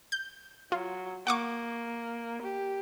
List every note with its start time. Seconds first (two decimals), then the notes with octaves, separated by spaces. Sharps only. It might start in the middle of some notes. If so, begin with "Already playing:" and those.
0.12 G6
0.72 F#3 F4
1.27 A#3 F#5 C#6 D6
2.42 G4